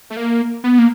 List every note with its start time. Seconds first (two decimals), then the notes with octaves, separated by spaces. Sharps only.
0.10 A3
0.17 A#3
0.64 B3
0.79 A#3